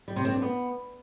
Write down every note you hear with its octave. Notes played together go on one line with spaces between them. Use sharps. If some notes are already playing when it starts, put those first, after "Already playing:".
G3
C3
C4
D4
B3